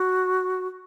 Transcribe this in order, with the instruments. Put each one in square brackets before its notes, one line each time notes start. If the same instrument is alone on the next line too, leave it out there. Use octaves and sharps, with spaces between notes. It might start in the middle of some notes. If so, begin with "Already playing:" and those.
Already playing: [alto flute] F#4